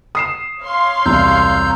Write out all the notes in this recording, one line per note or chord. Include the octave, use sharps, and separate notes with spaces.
D#6 C7 E7
C#5 F5 C6
E1 C2 C3 A#5 E6 G6